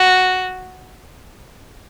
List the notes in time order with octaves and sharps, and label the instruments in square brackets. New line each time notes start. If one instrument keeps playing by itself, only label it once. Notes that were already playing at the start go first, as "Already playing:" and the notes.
Already playing: [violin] F#4